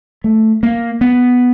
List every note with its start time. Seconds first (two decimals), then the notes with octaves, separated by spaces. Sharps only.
0.24 A3
0.63 A#3
1.01 B3